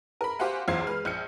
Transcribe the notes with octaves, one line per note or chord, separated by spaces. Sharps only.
A#4 B5
F#4 G4 C5 F5 F#5 G#5
B1 E2 F4 C5 G#6 C7
G#3 B4 F6
A#1 G6 C#7